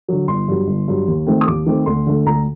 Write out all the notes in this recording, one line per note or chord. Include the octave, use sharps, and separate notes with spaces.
D3 F#3
G1 C6
G2 F#3
G1
G2 F#3
D#2
D#3 A3 C4
D#6
D#2 D6
D#3 A3 C4
D2 C6
D3 A3
D2 A#5